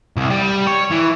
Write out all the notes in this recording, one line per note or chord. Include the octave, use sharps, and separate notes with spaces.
C2
G3
C#5
E3